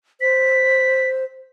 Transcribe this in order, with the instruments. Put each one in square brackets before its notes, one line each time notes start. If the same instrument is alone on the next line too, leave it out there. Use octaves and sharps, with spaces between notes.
[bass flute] C5 [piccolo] B6